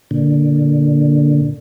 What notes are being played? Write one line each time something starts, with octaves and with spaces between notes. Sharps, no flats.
A#2 D3